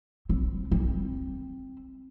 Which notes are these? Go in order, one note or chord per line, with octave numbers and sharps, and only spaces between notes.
C4
C4